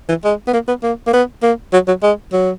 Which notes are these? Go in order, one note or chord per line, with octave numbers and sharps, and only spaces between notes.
E3
G#3
B3
A#3
B3
A#3
A#3
B3
A#3
F#3
F#3
G#3
F#3